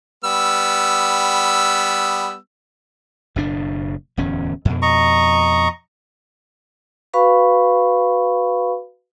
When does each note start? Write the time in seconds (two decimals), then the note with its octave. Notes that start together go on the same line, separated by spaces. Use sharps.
0.24 G3 B3 E6
3.36 F#1 B2 D4
4.17 D1 E2 C#4
4.65 F2 B2
4.82 D#5 A#5 C#6
7.14 F#4 B4 F5 B5 C#6